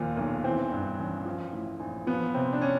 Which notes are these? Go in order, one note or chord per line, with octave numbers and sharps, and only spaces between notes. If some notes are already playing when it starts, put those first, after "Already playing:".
Already playing: D#2 A#2 F3
B1
E3 C4
G2
A1
F3
A2
A#1
F3 B3
C3 C4
D4
C#4